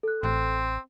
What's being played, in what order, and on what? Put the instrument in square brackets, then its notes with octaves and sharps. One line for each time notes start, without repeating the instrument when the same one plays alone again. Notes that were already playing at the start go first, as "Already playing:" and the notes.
[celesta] A4 F#6
[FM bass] A1 [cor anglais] C4